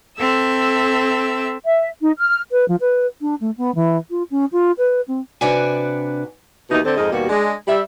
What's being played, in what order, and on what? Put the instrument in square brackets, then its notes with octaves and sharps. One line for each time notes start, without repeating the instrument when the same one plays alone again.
[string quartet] C4 A4 E5 E6
[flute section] E5
D#4
F6
[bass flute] B4
F3
B4
D4
A3
B3
E3
F4
C#4
F4
B4
C4
[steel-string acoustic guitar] C3 D4 F#4 B4 D5 G#5
[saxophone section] D#2 B2 E3 D#4
D3 C4
F2 G#2 A#4 D#5
D#2 B2 G3 A#3 F#4
G#3 D4
G3 E5